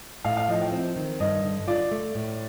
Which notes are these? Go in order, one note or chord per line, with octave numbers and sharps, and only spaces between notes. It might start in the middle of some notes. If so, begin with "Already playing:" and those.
A2 F5
F5
F3 D#5
G5
C4
D#3
G2 D#5
D3
F4 D5
A3
A2